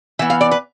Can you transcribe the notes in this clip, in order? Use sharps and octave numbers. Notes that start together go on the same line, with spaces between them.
E3 B3 E5
F5
D5
B4